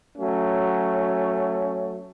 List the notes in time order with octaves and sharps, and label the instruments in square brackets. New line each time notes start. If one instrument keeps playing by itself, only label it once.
[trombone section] F#3 A3 C#4